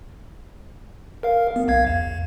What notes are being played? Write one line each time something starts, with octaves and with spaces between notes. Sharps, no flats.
A#4 F5
B3
B1 F5 G#6
E2